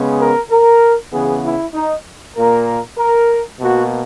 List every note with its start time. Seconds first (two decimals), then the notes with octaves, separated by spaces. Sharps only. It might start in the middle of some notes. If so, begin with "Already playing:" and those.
Already playing: C#3 G#3 B3
0.19 A#4
0.51 A#4
1.12 C#3 E3 B3 G#4
1.44 E4
1.74 D#4
2.36 A#2 A#3 A#4
2.98 A#4
3.59 B2 A#3 F#4